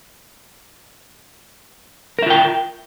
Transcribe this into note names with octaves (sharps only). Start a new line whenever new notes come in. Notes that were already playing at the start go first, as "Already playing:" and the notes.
F4 A#4 E5 G5